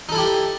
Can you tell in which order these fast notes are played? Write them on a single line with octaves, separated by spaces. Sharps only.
D#4 A4 E4 G4